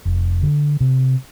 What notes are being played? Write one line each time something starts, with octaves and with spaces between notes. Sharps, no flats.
F1
D3
C3